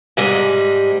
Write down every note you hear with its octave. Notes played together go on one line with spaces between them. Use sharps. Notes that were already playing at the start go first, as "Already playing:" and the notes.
G#2 G3 G#3